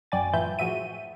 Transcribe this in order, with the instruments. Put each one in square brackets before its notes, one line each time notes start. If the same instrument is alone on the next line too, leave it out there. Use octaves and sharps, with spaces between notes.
[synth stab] F#2 F#3 D5 G5 G#5 A6
A2 E3 F4 B4 E5 G6
A2 F3 F#4 G#4 E5 D#7